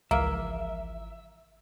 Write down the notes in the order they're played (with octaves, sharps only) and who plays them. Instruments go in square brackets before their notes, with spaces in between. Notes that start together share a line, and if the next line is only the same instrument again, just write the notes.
[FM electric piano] G#1 E3 F3 [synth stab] C#2 [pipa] A#3 [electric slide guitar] E5